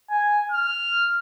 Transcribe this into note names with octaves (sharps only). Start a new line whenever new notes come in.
G#5
F6